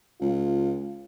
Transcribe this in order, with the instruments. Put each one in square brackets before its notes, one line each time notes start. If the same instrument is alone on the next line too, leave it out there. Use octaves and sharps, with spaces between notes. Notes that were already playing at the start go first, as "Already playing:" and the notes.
[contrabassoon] C#2 [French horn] F4